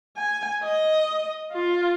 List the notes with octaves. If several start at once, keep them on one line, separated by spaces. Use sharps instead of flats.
G#5
D#5
F4